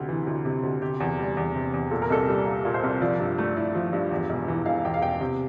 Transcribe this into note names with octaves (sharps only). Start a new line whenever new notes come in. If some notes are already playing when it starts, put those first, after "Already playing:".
Already playing: D2 C3 G4
E3
D2
C3
D2
C3 G4
E2
G3
E2
C3
E2
A#2 A4
A#4
C2 A4
G3
A#3
A#2
C5
C2
F3 D5
G2
A3
E4 D5
F3
G2
E2
E1
E3
E1 F5
E2 G5
F5
E1 G5
C3